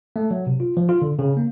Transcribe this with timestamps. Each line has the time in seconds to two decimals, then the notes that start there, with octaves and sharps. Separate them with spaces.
0.16 A3
0.31 F#3
0.47 C3
0.60 F4
0.77 F3
0.89 F4
1.02 D3
1.19 C#3
1.37 A#3